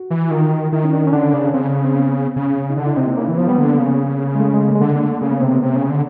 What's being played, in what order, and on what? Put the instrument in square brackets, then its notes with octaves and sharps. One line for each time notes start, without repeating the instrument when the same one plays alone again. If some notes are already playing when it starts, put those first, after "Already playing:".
Already playing: [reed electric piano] F#4
[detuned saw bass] E3
[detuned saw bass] D#3 [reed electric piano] F4
[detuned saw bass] D#3 [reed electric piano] E4
[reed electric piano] C#4
D4
C#4
[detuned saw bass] D3 [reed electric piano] D4
[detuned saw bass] C#3 [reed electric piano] D4
[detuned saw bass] C#3 [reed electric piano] C4
[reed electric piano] C4
B3
[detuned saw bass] C#3
[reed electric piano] D#4
[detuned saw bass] D3 [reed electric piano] D4
[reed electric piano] E4
[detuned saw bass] C3 [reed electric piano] D#4
[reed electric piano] A#3
[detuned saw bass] C#3 [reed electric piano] A#3
[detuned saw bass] E3
[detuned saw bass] F3 [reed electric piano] B3
[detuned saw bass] G3 [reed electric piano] B3
[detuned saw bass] D3 [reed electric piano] A#3
[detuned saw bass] C#3
[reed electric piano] G#3
A3
G#3
A#3
G#3
[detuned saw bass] D3 [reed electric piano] A3
[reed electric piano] A#3
A3
[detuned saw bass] C#3 [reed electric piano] A#3
[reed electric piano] B3
[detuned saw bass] C3 [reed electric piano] C4
[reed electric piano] B3
[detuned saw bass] C3
C#3
D3